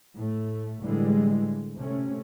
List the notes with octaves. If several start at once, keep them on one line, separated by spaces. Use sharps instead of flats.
A2 A3
A2 D3 E3 G3 G#3
C3 A3 C#4